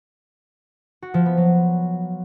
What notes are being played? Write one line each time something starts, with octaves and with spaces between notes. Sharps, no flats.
F#4
F3
B3
F#3